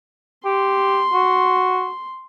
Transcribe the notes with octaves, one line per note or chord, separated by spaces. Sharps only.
G4 C6
F#4